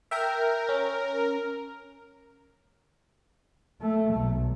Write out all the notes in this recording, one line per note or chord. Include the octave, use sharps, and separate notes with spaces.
A#4 E5 G5
C#4
A3
B1